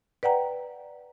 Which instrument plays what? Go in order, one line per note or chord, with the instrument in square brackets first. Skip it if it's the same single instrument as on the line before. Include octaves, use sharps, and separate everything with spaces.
[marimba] B4 D5 F#5 G5 A#5